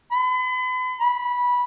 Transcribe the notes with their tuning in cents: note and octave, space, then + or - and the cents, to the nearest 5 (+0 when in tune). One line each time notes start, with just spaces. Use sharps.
B5 +40
B5 -15